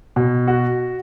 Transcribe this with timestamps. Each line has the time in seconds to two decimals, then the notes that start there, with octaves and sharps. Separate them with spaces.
0.16 B2
0.47 F#4